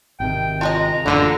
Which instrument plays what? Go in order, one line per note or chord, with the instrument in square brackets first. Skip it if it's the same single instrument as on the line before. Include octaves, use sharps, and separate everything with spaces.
[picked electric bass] G#1 C3 D#3 [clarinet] G5
[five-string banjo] F3 G#3 D#5 [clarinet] A#5
[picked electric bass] A1 F#2 [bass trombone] D3 [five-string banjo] F3 A#3 B3